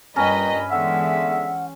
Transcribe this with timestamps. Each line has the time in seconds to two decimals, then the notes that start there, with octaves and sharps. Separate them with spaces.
0.16 G2 A#2 C#4 B4 D#5 G5 A#5 B5
0.71 D3 E3 G#3 B3 E5 F#5